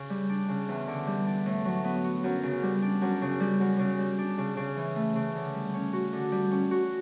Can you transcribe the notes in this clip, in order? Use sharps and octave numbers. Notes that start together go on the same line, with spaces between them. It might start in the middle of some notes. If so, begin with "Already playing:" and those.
Already playing: C#3
G3
D4
C#3
E2
D3
G3
D4
A2
F#3
B3
F#4
F#2
C#3
G3
D4
F#2
C#3
G3
F#2
C#3
G3
D4
C#3
C#3
E3
A3
C#3
D3
G3
C#4
F#4
D3
G3
C#4
F#4